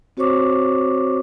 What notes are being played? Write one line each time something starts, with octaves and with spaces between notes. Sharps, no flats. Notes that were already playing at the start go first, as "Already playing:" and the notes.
C4 F#4 C5 C#5 C#6 D6